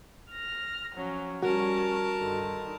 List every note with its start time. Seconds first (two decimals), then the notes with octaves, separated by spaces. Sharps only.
0.31 F6 A#6
0.95 F3 F#3 C#4
1.43 G3 C#4 F#4 A#4 A5
2.19 G2 D3 D#3